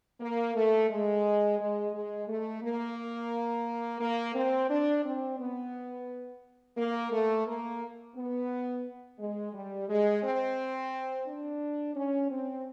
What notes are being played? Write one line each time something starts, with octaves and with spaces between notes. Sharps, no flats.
A#3
A3
G#3
G#3
G#3
A3
A#3
A#3
C4
D4
C4
B3
A#3
A3
A#3
B3
G#3
G3
G#3
C4
D4
C#4
C4